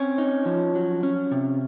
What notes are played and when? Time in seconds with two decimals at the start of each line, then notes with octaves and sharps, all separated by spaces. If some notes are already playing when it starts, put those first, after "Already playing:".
Already playing: C4 C#4 C#5
0.18 D#4
0.46 F3
0.75 F#3
1.03 C#4
1.31 C3